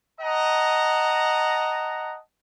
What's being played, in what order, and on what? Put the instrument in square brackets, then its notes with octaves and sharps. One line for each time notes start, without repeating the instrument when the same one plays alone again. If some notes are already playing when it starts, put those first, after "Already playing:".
[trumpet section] D#5 F#5 A5 A#5